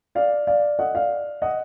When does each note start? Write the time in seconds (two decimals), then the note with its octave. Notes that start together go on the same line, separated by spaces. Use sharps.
0.15 D5 F5
0.47 D5 F5
0.79 D#5 F#5
0.94 D5 F5
1.42 D#5 F#5